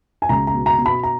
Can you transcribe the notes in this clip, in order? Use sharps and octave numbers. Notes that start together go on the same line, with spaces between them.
G#5
C#2 A#5
A#5
B2
A#5
B2
B5
A#5